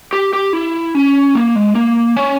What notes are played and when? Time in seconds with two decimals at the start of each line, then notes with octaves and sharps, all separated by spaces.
0.13 G4
0.33 G4
0.53 E4
0.95 C#4
1.35 A#3
1.55 G#3
1.75 A#3
2.17 C#4